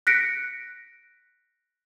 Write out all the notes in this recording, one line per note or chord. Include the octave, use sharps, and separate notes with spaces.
F#6 A#6 B6 C#7 D7